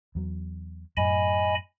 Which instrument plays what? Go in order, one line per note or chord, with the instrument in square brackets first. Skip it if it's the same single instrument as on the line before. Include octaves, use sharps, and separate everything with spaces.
[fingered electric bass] E2 F#3
[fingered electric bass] F#2 A2 [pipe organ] D#5 G#5 B5